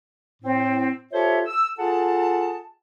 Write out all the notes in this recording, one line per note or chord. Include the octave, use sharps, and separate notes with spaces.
A2 C4
F4 G4 A4 C5 C#5 E5
E6
F4 G#4 A4 F#5 A5